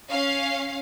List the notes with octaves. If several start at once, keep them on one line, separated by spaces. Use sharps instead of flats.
C#4 F5